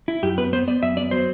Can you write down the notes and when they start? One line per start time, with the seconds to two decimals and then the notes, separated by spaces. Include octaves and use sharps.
0.08 E4
0.23 F#2 G4
0.38 B3 B4
0.53 B3 C5
0.67 B3 D5
0.82 F#2 E5
0.97 B3 D5
1.11 F#3 C5